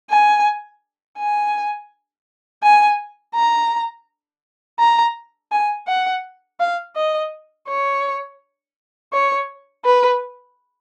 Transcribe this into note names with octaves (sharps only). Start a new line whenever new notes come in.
G#5
G#5
G#5
A#5
A#5
G#5
F#5
F5
D#5
C#5
C#5
B4